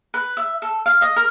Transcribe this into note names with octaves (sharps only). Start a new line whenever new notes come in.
B4
E5
A4
F5
D#5
A#4